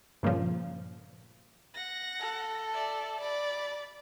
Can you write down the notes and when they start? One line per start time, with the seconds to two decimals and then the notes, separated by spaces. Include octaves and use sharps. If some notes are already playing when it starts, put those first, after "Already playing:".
0.23 G2 A#2 C#3 F3
1.74 F#5 A#6
2.20 A4
2.74 D5 E5
3.21 D5 B5